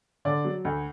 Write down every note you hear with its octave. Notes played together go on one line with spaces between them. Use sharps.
D3 D5
F#3
D2